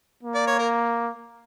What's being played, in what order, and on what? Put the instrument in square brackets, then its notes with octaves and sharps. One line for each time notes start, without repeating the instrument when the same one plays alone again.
[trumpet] A#3
[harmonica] D5
C#5
A#4